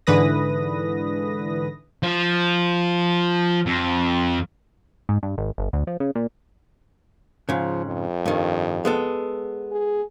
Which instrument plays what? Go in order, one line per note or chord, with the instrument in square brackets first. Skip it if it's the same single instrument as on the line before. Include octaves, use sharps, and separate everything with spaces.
[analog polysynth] G#2 D3 E3 B4 D#6 A#6
[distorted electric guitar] F3
F2
[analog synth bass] G#2
G2
G#1
G1
D2
F3
C#3
A#2
[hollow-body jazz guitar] G#2 C#3 [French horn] F3
[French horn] F2
[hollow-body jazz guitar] G2 D#3
G#3 B3 A4
[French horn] G#4